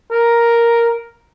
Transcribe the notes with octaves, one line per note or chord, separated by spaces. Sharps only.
A#4